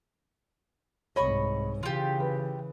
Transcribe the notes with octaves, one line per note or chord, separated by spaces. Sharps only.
C2 G#2 C#5 D#5 B5 C#6
C#3 E3 F4 G4
B4